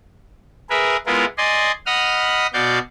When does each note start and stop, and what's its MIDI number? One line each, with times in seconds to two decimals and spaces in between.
0.70 0.97 68
0.70 0.97 70
0.70 0.97 71
0.70 0.97 76
1.06 1.25 56
1.06 1.25 59
1.06 1.25 64
1.06 1.25 65
1.06 1.25 70
1.38 1.72 74
1.38 1.72 75
1.38 1.72 80
1.38 1.72 84
1.86 2.47 75
1.86 2.47 78
1.86 2.47 83
1.86 2.47 87
1.86 2.47 89
2.53 2.79 47
2.53 2.79 66
2.53 2.79 74
2.53 2.79 77
2.53 2.79 91